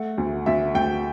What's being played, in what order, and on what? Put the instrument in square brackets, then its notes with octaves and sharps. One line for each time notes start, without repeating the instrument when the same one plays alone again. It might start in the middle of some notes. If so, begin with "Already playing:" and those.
Already playing: [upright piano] A3 F#5
D2
D2 E5
D2 G5